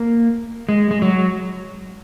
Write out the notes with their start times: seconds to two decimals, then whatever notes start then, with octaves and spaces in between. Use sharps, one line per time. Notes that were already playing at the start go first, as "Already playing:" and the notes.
Already playing: A#3
0.69 G#3
0.91 G#3
1.02 F#3